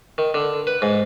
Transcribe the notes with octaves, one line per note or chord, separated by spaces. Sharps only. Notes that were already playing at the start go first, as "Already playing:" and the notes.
D#3
D3
B4
G#2